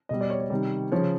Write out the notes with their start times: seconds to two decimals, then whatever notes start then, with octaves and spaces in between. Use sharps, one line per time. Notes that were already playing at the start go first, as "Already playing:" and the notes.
0.09 B2 G3 D#5
0.21 D5
0.30 C#5
0.40 C#5
0.50 C3 D#3 G3
0.92 C#3 F3 C#5